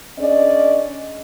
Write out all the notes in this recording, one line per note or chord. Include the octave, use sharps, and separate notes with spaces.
C#4 D4 G#4 D5 D#5